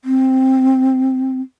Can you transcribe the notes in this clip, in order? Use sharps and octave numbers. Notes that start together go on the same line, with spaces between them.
C4